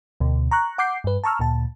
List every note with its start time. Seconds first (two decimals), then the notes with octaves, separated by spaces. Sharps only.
0.20 D2 B2
0.51 A#5 C#6 F#6
0.78 F#5 D6 G6 C7
1.04 G2 B4
1.24 A5 A#5 C#6 E6 F6
1.39 D2 A#2 A5